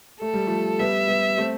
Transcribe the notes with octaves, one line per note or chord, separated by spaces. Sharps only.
A3 A4
G3
F3 A3
G3 B3 E5
G3 B3
A3 C4